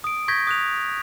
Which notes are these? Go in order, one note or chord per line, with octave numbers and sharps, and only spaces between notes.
D#6 D7
C#6 G6 G#6 A#6 B6
D#6 F#6 F7